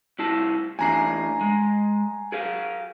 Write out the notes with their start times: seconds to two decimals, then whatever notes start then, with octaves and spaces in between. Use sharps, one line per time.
0.19 C2 E4 A5
0.79 A2 E3 D4 G#5 A#5 C7
1.41 G#3
2.32 G#4 A#4 F5